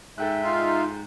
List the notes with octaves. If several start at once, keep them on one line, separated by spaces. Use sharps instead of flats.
G#2 A4 E5 G5 F#6
D#4 F4 F5